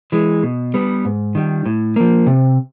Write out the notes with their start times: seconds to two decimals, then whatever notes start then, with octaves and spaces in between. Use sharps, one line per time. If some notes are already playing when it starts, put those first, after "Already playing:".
0.12 E3 G#3
0.43 B2
0.74 G3 B3
1.05 G#2
1.35 D#3 G3
1.66 A2
1.96 F3 A#3
2.27 C3